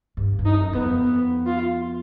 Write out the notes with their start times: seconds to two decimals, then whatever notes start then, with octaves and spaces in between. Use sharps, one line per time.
0.17 G2
0.39 G2
0.45 D#4
0.60 F#2
0.73 F#2 B3
0.82 F2
1.03 B3
1.46 F4